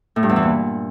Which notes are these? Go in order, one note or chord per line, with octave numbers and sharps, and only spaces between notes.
A2
G2
E2
E3
A#2